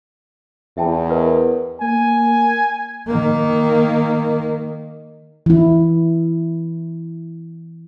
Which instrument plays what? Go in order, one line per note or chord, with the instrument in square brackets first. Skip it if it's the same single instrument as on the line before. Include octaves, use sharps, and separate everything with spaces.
[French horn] E2 [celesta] E5 G5 A5
[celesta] A#4 B4 D#5
[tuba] A#3 [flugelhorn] G#5
[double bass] D#3 A#3
[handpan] E3 E4